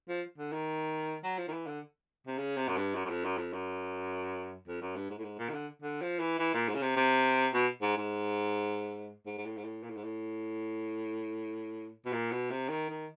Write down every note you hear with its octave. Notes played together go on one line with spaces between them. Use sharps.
F3
D3
D#3
F#3
F3
D#3
E3
D3
C3
C#3
C3
F#2
G2
F#2
F#2
F2
F#2
F2
F#2
F2
F#2
G2
G#2
A2
G#2
A#2
D#3
D3
D3
F3
E3
E3
A#2
G#2
C#3
C3
C3
B2
G#2
G#2
G#2
G#2
A2
G#2
A2
A#2
A2
G#2
A2
B2
A#2
B2
C3
D#3
D#3